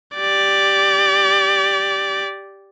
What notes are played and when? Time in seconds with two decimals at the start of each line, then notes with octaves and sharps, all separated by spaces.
0.16 G4 D5